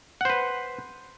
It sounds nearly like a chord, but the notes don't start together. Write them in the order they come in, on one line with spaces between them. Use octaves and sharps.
F#5 C5 B4